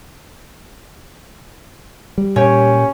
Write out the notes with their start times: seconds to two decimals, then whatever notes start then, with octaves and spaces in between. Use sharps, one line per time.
2.18 G3
2.36 A#2 C#4 G4 C#5